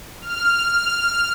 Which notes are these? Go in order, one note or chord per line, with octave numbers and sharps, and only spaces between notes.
F6